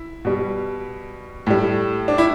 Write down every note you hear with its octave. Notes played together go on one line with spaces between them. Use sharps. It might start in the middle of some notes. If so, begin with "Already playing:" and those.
Already playing: E4
B2 G3
A2 G3
D4
E4